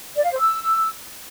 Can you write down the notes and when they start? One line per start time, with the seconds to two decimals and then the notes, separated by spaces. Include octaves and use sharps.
0.16 D5
0.24 F5
0.32 C5
0.40 E6